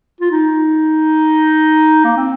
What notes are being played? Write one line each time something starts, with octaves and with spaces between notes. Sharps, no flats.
F4
D#4
A#3
C4